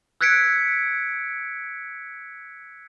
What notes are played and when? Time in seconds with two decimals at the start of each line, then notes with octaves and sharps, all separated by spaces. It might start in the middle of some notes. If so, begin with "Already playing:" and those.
0.21 E6 F#6 G#6 B6 C#7 D7